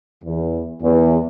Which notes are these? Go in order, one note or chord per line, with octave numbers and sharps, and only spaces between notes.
E2
E2